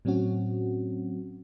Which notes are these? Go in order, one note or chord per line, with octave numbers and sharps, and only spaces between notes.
A2 F#3 C4 C#4 F#4